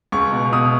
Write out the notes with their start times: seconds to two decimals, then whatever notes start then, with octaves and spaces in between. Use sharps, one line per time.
0.12 C#2 C#6
0.32 B2
0.52 B2 D#6